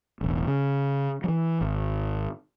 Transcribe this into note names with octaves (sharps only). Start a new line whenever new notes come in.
E1 A1
C#3
E3 F#3
G#1